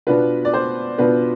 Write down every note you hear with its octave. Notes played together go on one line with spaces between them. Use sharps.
B2 B3 D4 F4 B4
D5
C5
B2 B3 D4 F4 B4